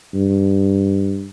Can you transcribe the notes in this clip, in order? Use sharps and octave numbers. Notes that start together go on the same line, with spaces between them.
G2